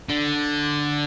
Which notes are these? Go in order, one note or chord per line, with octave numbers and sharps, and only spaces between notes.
D3